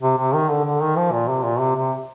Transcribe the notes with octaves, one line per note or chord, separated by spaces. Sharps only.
C3
C3
D#3
D3
D3
D#3
F3
A#2
C3
A#2
C3
C3